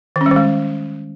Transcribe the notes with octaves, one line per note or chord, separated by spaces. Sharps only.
D#3
C#4
G3
D#3
G#3